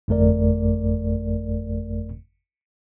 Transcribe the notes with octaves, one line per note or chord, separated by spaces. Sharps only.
G1 F2 A3 A#4 D5